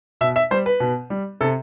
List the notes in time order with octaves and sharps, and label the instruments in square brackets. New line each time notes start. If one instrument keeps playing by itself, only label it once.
[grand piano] B2 E5
E5
G3 C5
B4
B2
G3
C3 A4